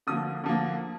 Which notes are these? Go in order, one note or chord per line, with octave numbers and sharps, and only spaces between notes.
D3 F3 A#3 D#6
D3 F3 A#3